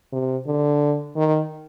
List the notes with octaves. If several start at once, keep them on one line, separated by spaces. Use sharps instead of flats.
C3
D3
D#3